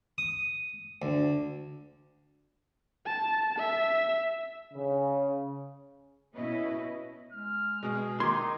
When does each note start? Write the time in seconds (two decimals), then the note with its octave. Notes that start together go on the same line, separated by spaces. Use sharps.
0.18 D#6
1.02 D2
3.06 A5
3.58 E5
4.74 C#3
6.34 B2 C#4 E4 B4 D#5
7.33 G#3 F6
7.83 B2 G#3 G#4
8.20 D#3 D#4 A#5 C6 D6 G#6